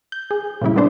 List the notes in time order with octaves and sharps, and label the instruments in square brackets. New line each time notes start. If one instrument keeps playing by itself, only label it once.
[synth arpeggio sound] G6
G#4
A#2 C#3 G3 E4
G#3 B3 C4 D4 C5